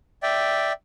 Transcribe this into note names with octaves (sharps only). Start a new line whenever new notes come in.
D5 E5 G5